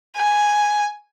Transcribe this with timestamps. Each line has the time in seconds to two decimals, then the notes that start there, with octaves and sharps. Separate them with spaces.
0.17 G#5